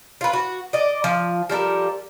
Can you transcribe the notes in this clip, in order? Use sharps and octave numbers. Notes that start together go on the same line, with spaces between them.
F4 B4
F#4
D5 D#5
F3
F3 G3 A4 A#4